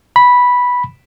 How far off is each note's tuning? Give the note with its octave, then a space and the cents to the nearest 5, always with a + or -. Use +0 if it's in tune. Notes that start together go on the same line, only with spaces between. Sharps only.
B5 -5